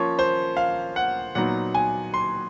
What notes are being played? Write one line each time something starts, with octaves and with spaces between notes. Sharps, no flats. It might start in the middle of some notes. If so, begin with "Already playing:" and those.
Already playing: F3 A#3 C#4 C#5
C5
F5
F#5
A#2 F#3 B3 D#4 F#5
G#5
C6